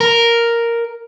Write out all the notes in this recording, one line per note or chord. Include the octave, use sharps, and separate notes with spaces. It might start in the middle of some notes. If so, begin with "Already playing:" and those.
A#4